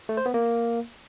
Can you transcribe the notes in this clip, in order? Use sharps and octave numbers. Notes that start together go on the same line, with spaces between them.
A3
C5
B3
A#3